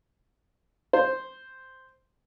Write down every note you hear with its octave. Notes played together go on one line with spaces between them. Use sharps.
C5